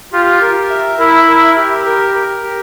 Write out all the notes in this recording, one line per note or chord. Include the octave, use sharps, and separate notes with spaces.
F4 G4
A#4
E5
E4 A#4
A#4
G4
A#4
A#4
G4